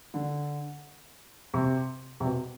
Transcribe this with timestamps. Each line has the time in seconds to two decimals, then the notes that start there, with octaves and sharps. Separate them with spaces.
0.14 D3
1.54 C3
2.20 C3
2.25 B2